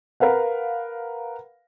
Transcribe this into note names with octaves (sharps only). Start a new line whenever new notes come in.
A#4 B4 F5 F#5